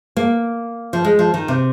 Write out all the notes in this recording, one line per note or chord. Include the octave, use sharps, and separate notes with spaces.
A#3
F3
G#3
F3
D#3
C3